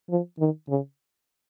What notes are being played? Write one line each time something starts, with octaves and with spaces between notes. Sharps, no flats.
F3
D#3
C#3